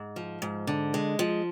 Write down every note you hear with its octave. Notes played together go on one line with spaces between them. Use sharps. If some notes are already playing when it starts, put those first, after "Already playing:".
Already playing: G#2
F3
G#2
D3
G#3
F3